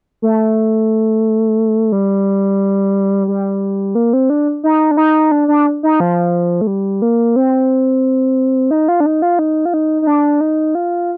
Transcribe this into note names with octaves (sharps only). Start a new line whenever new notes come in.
A3
G3
G3
A#3
C4
D4
D#4
D4
D#4
D4
D4
D#4
F3
A3
G3
A#3
C4
D#4
F4
D4
D#4
F4
D#4
F4
D#4
D#4
D4
D#4
F4